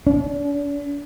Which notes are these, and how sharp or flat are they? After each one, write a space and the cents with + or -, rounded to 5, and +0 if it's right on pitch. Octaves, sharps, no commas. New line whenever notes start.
D4 -40